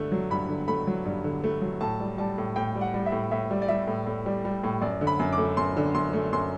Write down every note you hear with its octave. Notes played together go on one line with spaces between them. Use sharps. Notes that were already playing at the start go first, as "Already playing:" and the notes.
Already playing: G2 D3 A3
F#3
G2 B5
D3
A3 B5
F#3
G2
D3
A3
F#3
A2 A5
G3
G3 A5
A2
A2 G5
G3
F#5
G3
E5
A2
A2 E5
G3
D5
G3 E5
A2
A2
G3
G3
A2
F#2 D5
D3
B5
F#2
D6
A3
F#2 C6
D3
F#2 C6
A3
F#2 C6